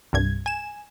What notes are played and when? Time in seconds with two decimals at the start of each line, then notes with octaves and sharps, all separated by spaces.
0.13 C2 G2 G#6
0.46 G#5 E7